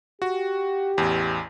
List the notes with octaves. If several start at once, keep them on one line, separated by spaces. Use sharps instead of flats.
F#4 G4
A1 E2